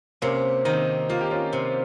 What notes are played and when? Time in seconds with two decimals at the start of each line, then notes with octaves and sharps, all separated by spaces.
0.22 C3 A#3 C#4
0.65 D#3 C4 D#4
1.09 A#3 F4
1.21 G4
1.31 C#4 F4
1.53 C3